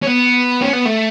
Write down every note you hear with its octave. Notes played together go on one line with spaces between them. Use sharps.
C#4
B3
C#4
B3
A3